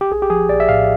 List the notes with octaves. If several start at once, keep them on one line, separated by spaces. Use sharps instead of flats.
G4
A#1 G#4
G4
F3 G#4
A#1 D5
E5
A2 F5